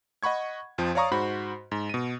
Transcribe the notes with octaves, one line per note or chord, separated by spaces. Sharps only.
D#5 F#5 B5 C#6 G#6
F2 F3
C#5 D5 F5 A#5 C#6 D#6
G#2 F#4 C5 B5
G#2
B2 D#7